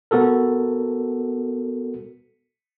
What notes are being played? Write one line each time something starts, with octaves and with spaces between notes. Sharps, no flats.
B3 F#4 A4 A#4